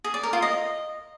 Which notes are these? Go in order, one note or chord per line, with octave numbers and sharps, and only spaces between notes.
G#4
D5
A#4
F4
D#5